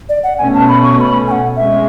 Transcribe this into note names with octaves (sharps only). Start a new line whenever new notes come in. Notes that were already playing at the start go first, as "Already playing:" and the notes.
D5
F#5
B2 A3 C#4 G#5
A5
B5
C#6
C#6
B5
G#5
F#5
G#3 C#4 E5